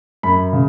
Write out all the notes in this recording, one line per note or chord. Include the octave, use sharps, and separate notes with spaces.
F#2 B5
C#3